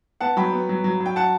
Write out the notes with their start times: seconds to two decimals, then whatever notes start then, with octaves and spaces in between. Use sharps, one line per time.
0.21 B3 F#5 A5
0.37 F#3 G5 B5
0.52 B3
0.69 F#3
0.84 F#3
1.00 F#3
1.06 G5
1.16 F#5 A5